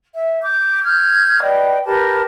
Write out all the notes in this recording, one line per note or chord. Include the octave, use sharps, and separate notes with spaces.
E5
D6 G6
F6 G6 G#6
B4 D5 D#5 G5
G4 A#4 B4 A5